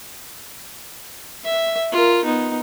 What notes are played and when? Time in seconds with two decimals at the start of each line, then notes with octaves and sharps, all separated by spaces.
1.44 E5
1.92 F4 A#4
2.25 B3 D#4